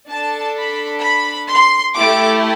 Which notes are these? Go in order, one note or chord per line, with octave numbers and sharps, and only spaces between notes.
D4 A4 A5
B5
B5
C6
A3 E4 G4 D6